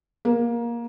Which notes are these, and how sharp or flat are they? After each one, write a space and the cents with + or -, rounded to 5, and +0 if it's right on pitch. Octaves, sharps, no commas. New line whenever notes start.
A#3 +15